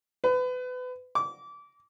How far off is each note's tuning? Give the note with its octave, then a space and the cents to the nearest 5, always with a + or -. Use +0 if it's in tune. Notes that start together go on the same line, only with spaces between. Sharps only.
B4 +30
D6 -25